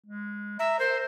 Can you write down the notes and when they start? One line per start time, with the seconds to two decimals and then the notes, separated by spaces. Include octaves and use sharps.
0.06 G#3
0.59 E5 A#5
0.79 A#4 C5